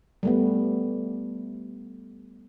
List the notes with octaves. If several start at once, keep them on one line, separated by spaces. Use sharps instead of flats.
G3 A3 B3